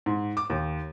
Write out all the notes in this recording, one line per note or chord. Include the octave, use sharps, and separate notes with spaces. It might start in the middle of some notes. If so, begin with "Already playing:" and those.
G#2
D6
D#2